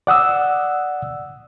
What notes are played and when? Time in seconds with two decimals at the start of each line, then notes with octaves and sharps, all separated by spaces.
0.07 D5 F#5 D#6 E6